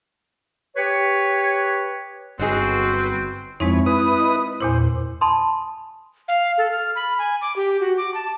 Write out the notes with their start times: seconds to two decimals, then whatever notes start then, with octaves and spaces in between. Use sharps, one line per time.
0.77 G4 B4 C#5
2.39 G1 F#3 C4 D#4 F#4 G#4 B4
3.60 F2 G#3 C4 D#4 E4 C#5
3.86 E4 B4 D#6
4.20 D#5
4.61 E2 A#2 E4 C5
5.21 G#5 A5 B5 C6 D#6
6.28 F5
6.58 A4
6.72 F6
6.96 B5
7.19 G#5
7.42 D6
7.56 G4
7.81 F#4
7.97 D6
8.14 A5